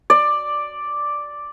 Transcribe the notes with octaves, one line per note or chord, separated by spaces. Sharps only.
D5